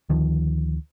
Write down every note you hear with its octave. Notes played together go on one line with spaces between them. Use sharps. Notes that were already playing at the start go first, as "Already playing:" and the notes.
D2 D#3 F3